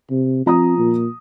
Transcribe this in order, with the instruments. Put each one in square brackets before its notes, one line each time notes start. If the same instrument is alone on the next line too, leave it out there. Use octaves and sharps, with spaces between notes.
[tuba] C3
[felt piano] F3 A#5 D#6 [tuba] C4
[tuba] A#2